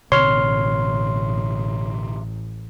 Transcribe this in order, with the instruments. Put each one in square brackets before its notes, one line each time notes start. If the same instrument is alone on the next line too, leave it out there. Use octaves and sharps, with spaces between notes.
[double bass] A1 [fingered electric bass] B2 D3 C4 [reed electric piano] C#5 F6 [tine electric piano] C6